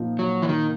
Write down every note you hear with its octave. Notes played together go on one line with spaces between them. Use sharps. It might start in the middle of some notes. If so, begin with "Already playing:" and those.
Already playing: A#2 F3 A#3 D#4
F#3
E3
D#3